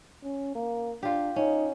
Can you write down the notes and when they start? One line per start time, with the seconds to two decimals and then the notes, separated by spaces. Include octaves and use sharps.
0.24 C#4
0.55 A#3
1.03 D4 F4 G4
1.36 C#4 D#4